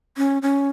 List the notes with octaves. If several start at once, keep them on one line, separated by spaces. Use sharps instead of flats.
C#4
C#4